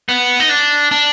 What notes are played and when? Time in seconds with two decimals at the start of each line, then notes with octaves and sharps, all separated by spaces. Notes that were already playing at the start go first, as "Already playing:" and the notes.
0.09 B3
0.40 D#4
0.49 D4
0.91 D4